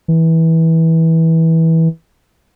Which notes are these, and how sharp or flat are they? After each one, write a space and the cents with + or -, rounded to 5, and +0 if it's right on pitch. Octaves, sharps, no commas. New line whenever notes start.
E3 -20